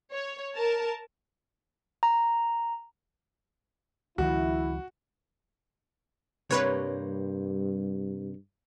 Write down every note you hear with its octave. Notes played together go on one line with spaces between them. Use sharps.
C#5
A#4 A5
A#5
C#2 D#3 F3 E4 F#4
G2 C3 G3 A#3 B4 C#5